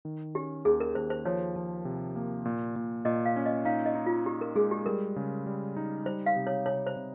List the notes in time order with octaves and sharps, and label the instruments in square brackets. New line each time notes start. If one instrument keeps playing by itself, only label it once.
[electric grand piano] D#3
[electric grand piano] C#4 [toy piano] G4
[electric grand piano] D#2 [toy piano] G#4
[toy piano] A#4
[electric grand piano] D#2 [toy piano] C5
[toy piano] C5
[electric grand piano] F3 [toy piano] C#5
[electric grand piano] F3
C3
A#3
A#2
A#2
[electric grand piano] A#2 [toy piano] D#5
[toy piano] F5
[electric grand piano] C#4
[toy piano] D#5
[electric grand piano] D#4 [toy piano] F5
[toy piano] D#5
[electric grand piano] D#4
[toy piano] F4
[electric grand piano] D#4 [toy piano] G4
[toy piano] A#4
[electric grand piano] G#3 [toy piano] G#4
[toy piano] G4
[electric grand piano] G3 [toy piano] A#4
[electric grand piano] C#3
G3
D#4
[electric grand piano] G3 [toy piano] C5
[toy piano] F5
[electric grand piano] C3
[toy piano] C#5
[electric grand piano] C3 [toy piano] C#5
[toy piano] C5
[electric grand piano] C3